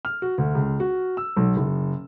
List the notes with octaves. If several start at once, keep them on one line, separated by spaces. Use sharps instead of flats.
F6
F#4
D2
C#2
F#4
E6
B1
F#1